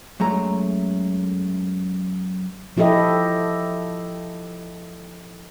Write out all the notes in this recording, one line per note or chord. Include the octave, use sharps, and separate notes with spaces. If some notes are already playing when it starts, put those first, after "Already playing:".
F#2 G#3 A3 A#5
F3 E4 G4 A4 D#5